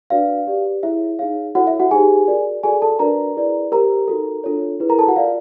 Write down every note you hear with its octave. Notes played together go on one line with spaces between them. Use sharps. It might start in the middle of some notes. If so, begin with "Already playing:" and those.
D4 F#4 B4 D5 F5
G4 B4 D5
E4 G#4 C#5 E5
D#4 G#4 C#5 F5
E4 F#4 A4 C#5 F#5
E5
F#4 F#5
D#4 G4 G#4 C5 G#5
F#4 A#4 D5
F#4 G#4 A4 D5 G#5
A4 A5
D4 F#4 A#4 B4 D5 A#5
E4 G#4 B4 D5
G4 A#4 C5 A#5
D#4 F#4 A4
D4 F4 A4 C#5
E4 G#4 B4
A#4 A#5
A4 A5
F#4 F#5
F4 A#4 D5 F5